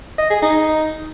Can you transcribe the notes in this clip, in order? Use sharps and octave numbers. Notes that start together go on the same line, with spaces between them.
D#5
G#4
D#4